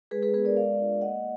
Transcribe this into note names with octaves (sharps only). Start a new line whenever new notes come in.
G#3 G#4 B4
G#4 B4
B3 D4 G#4 B4
A#4 D5
G#3 D5 F5
D4 F4
A#3 D#5 F#5